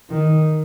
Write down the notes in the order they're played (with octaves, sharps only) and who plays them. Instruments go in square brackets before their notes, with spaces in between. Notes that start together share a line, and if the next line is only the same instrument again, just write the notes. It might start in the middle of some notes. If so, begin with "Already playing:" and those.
[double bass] D#3